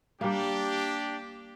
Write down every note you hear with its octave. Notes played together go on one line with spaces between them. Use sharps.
G3 A#3 D4 G4